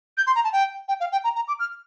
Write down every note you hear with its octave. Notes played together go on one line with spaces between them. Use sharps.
G6
C6
A#5
A5
G5
G5
F5
G5
A#5
A#5
D6
F6